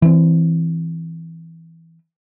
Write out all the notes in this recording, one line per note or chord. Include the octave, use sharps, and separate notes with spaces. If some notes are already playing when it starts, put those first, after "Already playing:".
E3 C4